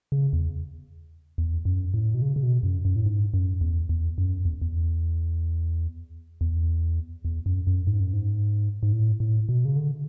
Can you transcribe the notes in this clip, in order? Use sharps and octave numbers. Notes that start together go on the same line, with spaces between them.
C#3
E2
E2
F#2
A2
B2
C#3
C#3
B2
F#2
F#2
A2
G#2
F#2
E2
E2
F#2
E2
E2
E2
E2
F#2
F#2
G#2
F#2
G#2
G#2
A2
A2
B2
C#3
D3